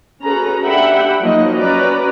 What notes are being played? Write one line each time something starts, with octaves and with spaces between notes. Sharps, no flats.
C#4 F#4 G#4 A4 B4 A#5
D4 G4 E5 F#5 G5 B5
F3 F#3 A#3 D#4 D#5
C#4 F#4 B4 D5 A#5